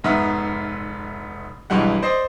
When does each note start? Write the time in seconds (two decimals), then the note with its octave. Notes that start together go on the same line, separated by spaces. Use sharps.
0.04 F1 G#2 B3 E5 F6
1.70 B1 G2 E3 G3 G#3 F#5
2.03 C5 D5 D#5 C7